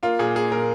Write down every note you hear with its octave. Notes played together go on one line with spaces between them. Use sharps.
A#3 F4
A#2 G#4
A#3 G#4
A#2 A#4